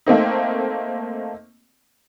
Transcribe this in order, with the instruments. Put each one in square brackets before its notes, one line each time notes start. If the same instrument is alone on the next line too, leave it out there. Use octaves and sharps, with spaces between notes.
[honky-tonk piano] A3 A#3 C4 D#4